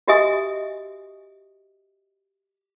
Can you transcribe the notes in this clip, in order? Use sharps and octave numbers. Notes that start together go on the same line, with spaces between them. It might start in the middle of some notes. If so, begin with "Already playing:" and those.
F#4 G4 D#5 E5 G#5 D#6